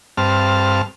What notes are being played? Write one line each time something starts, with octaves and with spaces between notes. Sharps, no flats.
G2 C4 A5 F6